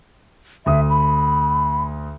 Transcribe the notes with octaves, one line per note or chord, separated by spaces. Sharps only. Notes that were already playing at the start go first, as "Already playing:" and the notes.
D2 E5 D#6
B5